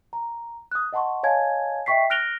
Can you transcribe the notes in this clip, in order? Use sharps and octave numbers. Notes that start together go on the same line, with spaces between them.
A#5
D#6 F#6
D#5 F#5 A5 C6 C#6
C#5 D#5 F5 G#5 A5 G#6
D#5 E5 G5 C#6 B6 C7
F6 F#6 A#6 D7 F7 G7